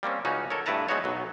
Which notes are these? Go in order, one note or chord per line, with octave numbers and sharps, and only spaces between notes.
G3 A#3 C4 C#4
C#2 C#3 C#4 D#4 F#4
A4 A#4 C#5
G2 A3 E4 B4 A5 A#5
F#3 G#3 B3 D#4 F#4 C#5
B1 F#3